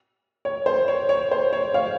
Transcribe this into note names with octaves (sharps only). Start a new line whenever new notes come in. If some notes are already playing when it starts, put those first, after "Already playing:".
C#5
C5
C#5
C#5
C5
C#5
C#5 F5